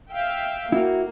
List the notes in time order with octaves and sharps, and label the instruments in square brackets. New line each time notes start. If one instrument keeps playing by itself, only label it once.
[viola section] E5 F5 G5
[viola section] A#3 [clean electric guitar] E4 F#4